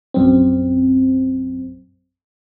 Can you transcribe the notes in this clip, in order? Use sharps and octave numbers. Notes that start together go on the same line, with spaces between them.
A#1 F#2 C4